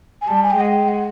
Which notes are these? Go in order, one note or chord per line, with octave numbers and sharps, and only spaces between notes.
G#5
G3 A5
G#5
G5
G#3 F#5
G5
F#5